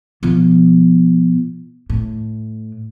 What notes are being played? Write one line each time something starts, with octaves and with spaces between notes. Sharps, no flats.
B2 F3
A2